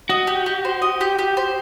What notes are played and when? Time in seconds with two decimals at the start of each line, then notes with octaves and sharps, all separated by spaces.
0.09 F#4 D#5
0.27 G4
0.46 G4
0.65 C5
0.82 D#5
1.01 G4
1.19 G4
1.37 C5